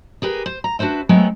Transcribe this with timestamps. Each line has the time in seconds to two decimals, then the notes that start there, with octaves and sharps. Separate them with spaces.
0.22 G4 G#4 A#4 B4
0.46 C5
0.64 A#5
0.79 D4 F#4 B4 C5 E5
1.09 F#3 G#3 A3 B3 C4